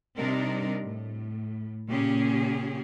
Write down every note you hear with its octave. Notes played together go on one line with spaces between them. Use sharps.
C3 G3 C4 D4 D#4 A#4
A2
A#2 C#3 C#4 G4 G#4